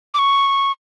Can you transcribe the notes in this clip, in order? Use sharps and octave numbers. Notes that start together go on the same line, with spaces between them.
D6
C#6